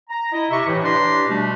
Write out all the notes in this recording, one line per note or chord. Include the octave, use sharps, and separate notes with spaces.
A#5
E4 D#5
C3 E5 C#6
A2 E3
D4 G4 B4 D5 A#5 C6
B2 G3 A3 D4